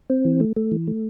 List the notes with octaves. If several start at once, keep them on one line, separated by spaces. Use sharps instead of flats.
C4
E3
A3
A3
E3
A3